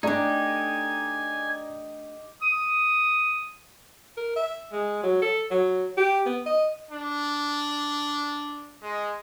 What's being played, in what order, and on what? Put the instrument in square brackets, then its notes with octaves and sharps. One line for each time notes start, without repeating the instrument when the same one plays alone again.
[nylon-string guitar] A3 D4 [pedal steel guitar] D#4 G4 [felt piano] D5 A#5 [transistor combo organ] G#5
[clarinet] D#6
[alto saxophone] A#4
E5
G#3
F#3
A4
F#3
G4
B3
D#5
[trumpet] D4
G#3